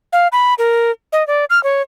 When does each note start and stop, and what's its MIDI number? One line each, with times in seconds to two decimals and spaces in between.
0.13 0.28 77
0.32 0.54 83
0.58 0.91 70
1.12 1.26 75
1.27 1.45 74
1.50 1.61 89
1.63 1.82 73